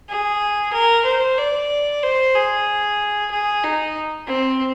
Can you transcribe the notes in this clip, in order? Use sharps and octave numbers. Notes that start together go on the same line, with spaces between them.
G#4
A#4
C5
D5
C5
G#4
G#4
D#4
C4